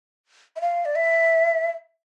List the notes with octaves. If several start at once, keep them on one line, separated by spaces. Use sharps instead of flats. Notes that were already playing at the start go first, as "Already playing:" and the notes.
E5
F5
D5
E5